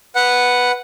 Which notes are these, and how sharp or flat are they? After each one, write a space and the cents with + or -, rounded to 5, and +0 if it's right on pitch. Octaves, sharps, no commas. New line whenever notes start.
B4 +0 F#5 +0